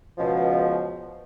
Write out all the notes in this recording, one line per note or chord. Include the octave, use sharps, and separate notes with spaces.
C#2 B2 F3